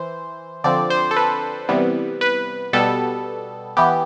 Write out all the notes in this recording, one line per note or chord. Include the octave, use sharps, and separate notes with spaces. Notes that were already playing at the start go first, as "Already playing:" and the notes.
Already playing: E3 C5
D3 F3 C4 D5
C5
A4
B4
C3 E3 G3 B3
B4
B2 G3 B3 A4
E3 B3 G4